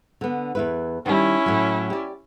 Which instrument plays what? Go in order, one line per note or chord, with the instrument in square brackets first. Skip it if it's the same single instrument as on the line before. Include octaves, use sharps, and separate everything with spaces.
[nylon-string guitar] D3 B3
E2 E4 B4
[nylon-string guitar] D#3 G3 [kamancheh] C#4 E4
[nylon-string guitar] A2 F#3
G4 D5